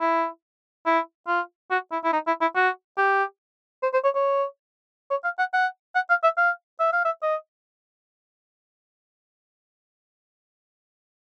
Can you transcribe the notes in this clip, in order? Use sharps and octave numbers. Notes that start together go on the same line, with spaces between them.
E4
E4
F4
F#4
E4
E4
D#4
E4
E4
F#4
G4
C5
C5
C#5
C#5
C#5
F5
F#5
F#5
F#5
F5
E5
F5
E5
F5
E5
D#5